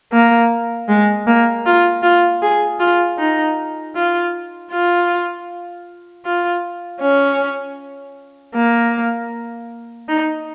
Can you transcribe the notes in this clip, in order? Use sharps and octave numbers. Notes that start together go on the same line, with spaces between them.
A#3
G#3
A#3
F4
F4
G#4
F4
D#4
F4
F4
F4
C#4
A#3
D#4